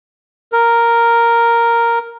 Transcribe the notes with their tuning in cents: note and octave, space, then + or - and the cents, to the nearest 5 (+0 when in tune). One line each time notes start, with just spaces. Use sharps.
A#4 +0